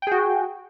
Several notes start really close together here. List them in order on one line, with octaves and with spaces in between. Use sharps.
G5 G#4 F#4